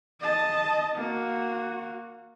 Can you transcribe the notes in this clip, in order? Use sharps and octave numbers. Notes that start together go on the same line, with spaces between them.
D#5 A5
A#3 F#4